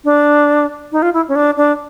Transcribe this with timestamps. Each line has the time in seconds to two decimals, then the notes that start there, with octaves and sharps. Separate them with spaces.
0.05 D4
0.92 D#4
1.02 F4
1.14 E4
1.29 C#4
1.36 D4
1.57 D4